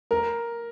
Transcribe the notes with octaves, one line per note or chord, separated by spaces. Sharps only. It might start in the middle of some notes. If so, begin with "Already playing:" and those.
A#4